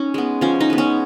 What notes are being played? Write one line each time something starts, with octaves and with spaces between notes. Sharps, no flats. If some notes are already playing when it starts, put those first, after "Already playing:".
Already playing: C#4 D#4
G#3 B3
F3 C#4
D#4
G#3 B3
C#4